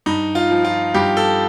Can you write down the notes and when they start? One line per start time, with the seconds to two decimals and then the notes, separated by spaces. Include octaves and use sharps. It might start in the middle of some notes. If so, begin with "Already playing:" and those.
0.06 G2 D#4
0.35 F4
0.50 F3
0.65 F4
0.94 G2 G4
1.17 A4